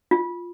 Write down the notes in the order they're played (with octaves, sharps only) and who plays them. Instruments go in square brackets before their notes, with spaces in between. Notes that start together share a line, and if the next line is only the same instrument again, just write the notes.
[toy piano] F4